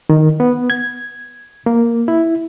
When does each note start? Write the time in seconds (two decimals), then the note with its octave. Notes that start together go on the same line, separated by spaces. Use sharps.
0.10 D#3
0.40 B3
0.70 G#6
1.66 A#3
2.08 E4